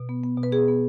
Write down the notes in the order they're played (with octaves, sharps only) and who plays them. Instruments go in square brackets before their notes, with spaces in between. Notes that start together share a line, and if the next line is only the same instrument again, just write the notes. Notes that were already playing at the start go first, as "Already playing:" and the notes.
Already playing: [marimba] B2
B3
B3
B2
B4
B3 G#4
B3